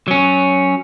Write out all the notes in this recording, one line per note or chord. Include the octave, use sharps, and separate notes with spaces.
F#3 C#4